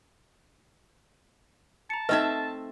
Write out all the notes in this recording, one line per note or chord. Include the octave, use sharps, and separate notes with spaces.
A5 A#5 C#7
A3 C4 D#4 B4 D#5 E5